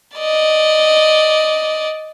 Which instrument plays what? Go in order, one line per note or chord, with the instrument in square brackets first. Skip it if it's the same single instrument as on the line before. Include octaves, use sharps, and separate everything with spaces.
[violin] D5 D#5